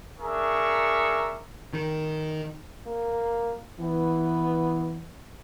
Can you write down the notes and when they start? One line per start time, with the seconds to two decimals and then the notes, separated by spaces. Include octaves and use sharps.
0.20 D4 G#4 A#4 E5 C#6
1.73 D#3
2.86 A#3
3.80 E3 B3